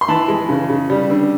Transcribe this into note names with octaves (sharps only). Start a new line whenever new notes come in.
C6
E3 A5 B5
G#3
C#3
C#3
G3
D3